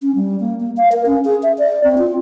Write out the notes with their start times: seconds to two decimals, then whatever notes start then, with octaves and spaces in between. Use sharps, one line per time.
0.02 C#4
0.15 G3
0.40 A#3
0.60 A#3
0.77 F5
0.92 A#4
1.06 C#4
1.25 G#4
1.43 E5
1.58 D5
1.84 C4
1.98 F4